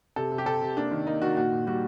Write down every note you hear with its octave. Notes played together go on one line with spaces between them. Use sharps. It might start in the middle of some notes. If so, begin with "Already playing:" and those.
C3 A4
C3
G4
C3 A4
C3
A#3 D4
D#3
A#3 D#4
D#3 F#4
A#2 F#4
A#2
G3 F#4